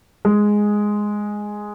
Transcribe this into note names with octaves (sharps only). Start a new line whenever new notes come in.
G#3